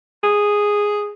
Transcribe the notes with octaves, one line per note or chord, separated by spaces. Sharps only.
G#4